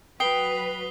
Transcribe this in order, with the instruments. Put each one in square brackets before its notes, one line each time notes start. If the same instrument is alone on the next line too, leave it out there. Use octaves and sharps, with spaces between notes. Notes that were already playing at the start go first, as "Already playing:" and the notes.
[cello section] F#3 F#4 B4 [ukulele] G5 [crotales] D#6 C7 G7